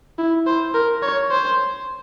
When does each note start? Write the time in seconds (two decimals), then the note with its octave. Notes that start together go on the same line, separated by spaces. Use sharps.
0.18 E4
0.46 C5
0.74 A#4
1.03 C#5
1.31 C5